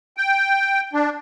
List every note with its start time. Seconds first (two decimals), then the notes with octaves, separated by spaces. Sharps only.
0.17 G5
0.93 D4